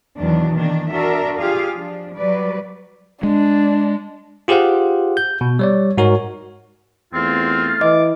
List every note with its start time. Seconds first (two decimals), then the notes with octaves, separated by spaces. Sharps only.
0.17 E2 B2 D#3 E3 F#3 D4
0.56 D#3 A#3 D4
0.90 D4 F#4 A#4 E5
1.37 F4 G4 G#4 F5
1.74 F3 D4
2.15 F#3 G3 B4 D5
3.23 G#3 D4
4.48 F4 G4 G#4 C5 F5 F#5
5.17 G6
5.41 B2
5.59 G3 C#5 D5
5.98 G#2 F#4 A#4 C#5
7.14 E2 A3 C4 F4
7.81 E3 D#5 D6